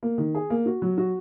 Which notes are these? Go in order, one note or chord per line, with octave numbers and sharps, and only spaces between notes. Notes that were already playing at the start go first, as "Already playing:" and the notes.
A#3
D#3
G#4
A#3
F#4
F#3
F#4